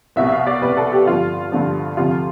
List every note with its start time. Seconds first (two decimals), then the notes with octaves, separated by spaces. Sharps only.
0.16 C2 B2 E5
0.27 E5
0.32 F5
0.47 D5
0.62 C2 B2 B4
0.77 A4
0.92 G4
1.07 G2 D3 F3 F4
1.52 G2 D3 F3
1.97 D2 C3 F3 F4